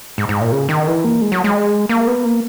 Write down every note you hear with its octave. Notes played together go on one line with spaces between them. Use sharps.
G#2
G#2
A#2
C#3
D#3
E3
A#3
G#3
F#3
G#3
A#3
B3
A#3